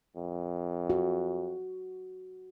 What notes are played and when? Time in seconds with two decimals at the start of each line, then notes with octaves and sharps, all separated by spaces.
0.16 F2
0.90 F#4